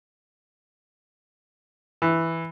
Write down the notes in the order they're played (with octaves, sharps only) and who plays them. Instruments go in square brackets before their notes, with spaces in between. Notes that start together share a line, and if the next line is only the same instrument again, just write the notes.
[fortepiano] E3